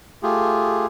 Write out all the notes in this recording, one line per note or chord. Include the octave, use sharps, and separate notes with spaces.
A3 F4 G4 G#4